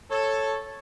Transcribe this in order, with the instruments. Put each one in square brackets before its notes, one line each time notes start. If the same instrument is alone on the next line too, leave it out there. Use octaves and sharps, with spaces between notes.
[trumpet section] A4 [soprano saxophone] C#5